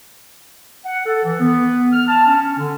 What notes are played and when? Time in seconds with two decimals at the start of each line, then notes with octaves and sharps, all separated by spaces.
0.85 F#5
1.06 A4
1.23 E3
1.40 B3
1.93 F6
2.07 A5
2.26 C#4
2.58 D3